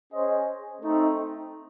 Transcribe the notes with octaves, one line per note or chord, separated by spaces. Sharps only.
C#4 G#4 C5 D#5
A3 C4 D#4